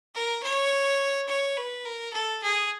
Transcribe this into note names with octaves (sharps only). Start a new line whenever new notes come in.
A#4
C#5
C#5
B4
A#4
A4
G#4